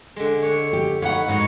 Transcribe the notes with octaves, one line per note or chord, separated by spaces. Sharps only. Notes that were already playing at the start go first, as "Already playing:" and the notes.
D3 G#3
D3 C#5
G4
D#4 B4 C#5 F5 F#5
G#2 D#4 F#4 C#5